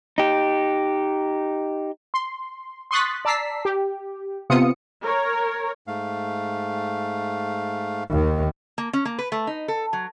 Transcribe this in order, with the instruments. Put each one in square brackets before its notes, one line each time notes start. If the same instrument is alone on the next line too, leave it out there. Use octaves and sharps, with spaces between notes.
[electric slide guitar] D#4 G4
[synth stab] C6
C6 C#6 D#6 F#6 A6 B6
D5 A5 A#5 E6 B6 C7
G4
C3 B3 F4 D#6 C#7
[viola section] A#4 C#5
[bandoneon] G#2 A3 F5
[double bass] D#2 D#3
[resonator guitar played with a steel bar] A#3
C#4
A#3
B4
A3
D#4
A4
F#3